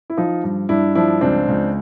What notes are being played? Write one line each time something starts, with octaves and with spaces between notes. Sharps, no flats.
E4
F3 D#4 F4
G2
G2 D4 E4
F3 D4 E4
C#2 C4 D4
C#2